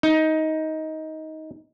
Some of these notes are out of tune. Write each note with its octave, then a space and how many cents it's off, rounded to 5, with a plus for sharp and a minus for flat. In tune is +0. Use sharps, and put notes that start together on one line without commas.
D#4 +15